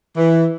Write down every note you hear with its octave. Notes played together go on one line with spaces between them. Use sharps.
E3